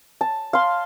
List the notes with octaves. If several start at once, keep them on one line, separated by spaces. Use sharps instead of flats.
A5
F5 C6